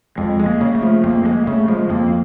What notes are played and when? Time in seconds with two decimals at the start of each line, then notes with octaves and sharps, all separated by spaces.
0.18 F2 G#3
0.40 G#3
0.46 A#3
0.61 C#3
0.75 A3
0.82 F3
1.04 F2 A#3
1.26 G#3 A#3
1.47 C#3 A3
1.68 F3 G#3
1.90 F2 A#3